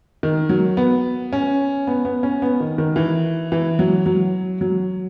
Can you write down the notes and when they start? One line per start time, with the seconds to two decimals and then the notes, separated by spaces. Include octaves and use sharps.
0.23 D#3
0.49 F#3
0.77 B3
1.33 C#4
1.87 B3
2.05 B3
2.23 C#4
2.42 B3
2.60 D#3
2.78 D#3
2.96 E3
3.52 E3
3.79 F#3
4.06 F#3
4.61 F#3